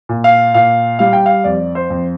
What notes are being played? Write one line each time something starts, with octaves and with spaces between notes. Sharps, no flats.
A#2
F5
A#2 F5
G3 F5
G5
F5
F2 D5
C5
F2